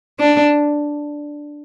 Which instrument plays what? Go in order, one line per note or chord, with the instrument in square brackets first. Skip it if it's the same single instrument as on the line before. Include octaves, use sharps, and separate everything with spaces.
[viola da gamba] D4